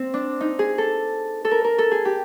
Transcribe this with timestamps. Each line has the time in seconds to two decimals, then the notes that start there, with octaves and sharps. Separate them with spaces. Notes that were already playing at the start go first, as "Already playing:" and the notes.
Already playing: C4
0.14 D4
0.40 D#4
0.59 G#4
0.78 A4
1.45 A4
1.51 A#4
1.64 A#4
1.78 A4
1.91 G#4
2.05 G4